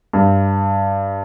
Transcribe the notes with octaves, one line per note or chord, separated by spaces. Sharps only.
G2